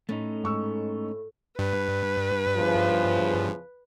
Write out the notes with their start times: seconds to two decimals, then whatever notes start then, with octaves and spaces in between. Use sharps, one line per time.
0.09 A2 A3 C#4 D#4
0.44 G#2 C#6 E6
1.59 G2 B4
2.57 E2 C#3 F3